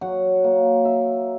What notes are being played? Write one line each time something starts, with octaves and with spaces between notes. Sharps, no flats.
F#3 F#5
A#3
E5